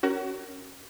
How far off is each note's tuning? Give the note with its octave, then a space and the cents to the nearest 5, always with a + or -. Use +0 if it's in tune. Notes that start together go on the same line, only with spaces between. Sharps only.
C#4 +0 F#4 +30 A#4 +0